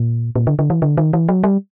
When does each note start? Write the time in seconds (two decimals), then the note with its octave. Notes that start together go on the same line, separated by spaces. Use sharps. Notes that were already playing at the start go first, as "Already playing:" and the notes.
Already playing: A#2
0.36 A#2
0.47 D3
0.59 D3
0.70 E3
0.82 D3
0.97 D#3
1.13 E3
1.29 F#3
1.44 G3